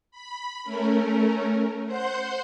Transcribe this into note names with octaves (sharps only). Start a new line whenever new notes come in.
B5
A3 C#4 A#4
C5 F#5 C6 G6